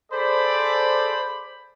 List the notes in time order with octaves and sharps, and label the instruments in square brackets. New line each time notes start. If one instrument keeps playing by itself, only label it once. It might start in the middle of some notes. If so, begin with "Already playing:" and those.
[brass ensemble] G#4 A4 D5 [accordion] C5 [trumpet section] B5